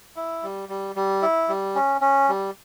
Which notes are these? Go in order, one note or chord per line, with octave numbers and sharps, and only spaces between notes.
E4
G3
G3
G3
E4
G3
C#4
C#4
G3